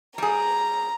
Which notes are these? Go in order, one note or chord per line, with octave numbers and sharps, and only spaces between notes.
G3 G#4 A#5